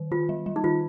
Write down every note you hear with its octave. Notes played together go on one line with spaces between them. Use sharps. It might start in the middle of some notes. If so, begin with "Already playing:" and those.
Already playing: D#3
D#3 F4
G3
G3
D#4
D#3 F4